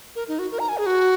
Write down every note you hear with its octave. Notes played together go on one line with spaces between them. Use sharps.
A#4
D#4
F#4
A#4
A#5
G#5
G#4
F#4